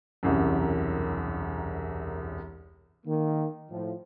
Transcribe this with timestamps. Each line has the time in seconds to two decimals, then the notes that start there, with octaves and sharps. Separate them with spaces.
0.23 E1 C2 F#2
3.07 D#3 A#3
3.70 A2 F3